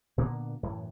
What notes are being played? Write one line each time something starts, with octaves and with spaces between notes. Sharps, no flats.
A#2 D3 A#3 B3
F#2 A2 E3